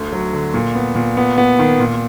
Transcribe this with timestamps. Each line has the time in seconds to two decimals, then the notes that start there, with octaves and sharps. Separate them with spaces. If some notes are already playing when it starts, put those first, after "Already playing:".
Already playing: D2
0.12 F#3
0.33 D3
0.54 A#2
0.75 B3
0.95 A#2
1.17 B3
1.38 B3
1.59 D#3
1.80 A#2